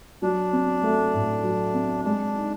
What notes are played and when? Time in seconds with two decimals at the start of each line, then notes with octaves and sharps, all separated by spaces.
0.22 F#3 D4
0.53 C4
0.83 A3
1.14 A2
1.43 F#3
1.74 C4
2.05 G#3 D4
2.36 D#4